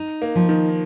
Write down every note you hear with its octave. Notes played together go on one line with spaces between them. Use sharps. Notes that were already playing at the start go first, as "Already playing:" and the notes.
Already playing: D#4
A#3
F3
D#3